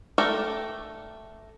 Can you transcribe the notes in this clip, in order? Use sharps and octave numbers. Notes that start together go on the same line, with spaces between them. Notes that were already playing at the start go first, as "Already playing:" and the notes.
A3 A4 A#4 D5 G5